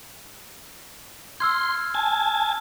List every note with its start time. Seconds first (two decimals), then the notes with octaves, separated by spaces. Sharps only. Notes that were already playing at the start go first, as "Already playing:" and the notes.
1.40 C6 E6 F6 G#6
1.94 G#5 A5